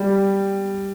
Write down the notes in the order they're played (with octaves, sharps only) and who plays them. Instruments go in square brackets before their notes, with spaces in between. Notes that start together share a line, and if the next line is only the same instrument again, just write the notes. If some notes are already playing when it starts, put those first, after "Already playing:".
Already playing: [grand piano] G3